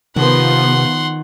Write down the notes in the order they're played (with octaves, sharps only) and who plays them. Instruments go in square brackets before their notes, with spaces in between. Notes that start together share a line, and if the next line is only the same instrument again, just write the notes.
[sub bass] C3 [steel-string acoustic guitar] D#3 [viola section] F3 B3 [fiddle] F#5 C6